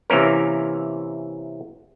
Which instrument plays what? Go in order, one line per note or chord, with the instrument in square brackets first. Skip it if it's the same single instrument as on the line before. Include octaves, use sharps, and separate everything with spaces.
[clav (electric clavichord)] C3 E3 A#3 C#4 A#4